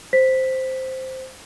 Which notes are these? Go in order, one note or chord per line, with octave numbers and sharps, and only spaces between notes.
C5 B6